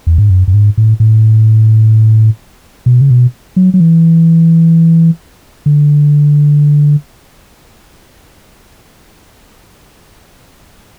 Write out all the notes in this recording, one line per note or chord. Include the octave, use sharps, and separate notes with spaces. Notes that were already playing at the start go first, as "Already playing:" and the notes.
E2
G#2
F#2
F#2
G#2
A2
A2
B2
C#3
B2
F#3
F#3
E3
D3